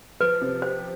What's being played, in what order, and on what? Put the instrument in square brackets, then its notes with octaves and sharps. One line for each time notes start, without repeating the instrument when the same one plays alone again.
[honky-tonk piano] F3 [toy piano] B4
[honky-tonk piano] C3
[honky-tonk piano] G4 [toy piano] C5